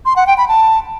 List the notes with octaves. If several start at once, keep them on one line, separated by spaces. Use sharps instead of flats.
C6
F#5
G5
B5
A5